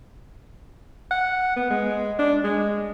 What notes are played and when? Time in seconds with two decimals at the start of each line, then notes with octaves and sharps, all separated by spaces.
1.11 F#5
1.56 B3
1.70 G#3
2.19 D4
2.44 G#3